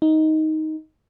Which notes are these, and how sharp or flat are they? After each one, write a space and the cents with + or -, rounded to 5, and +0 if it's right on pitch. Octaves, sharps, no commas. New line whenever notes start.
D#4 +10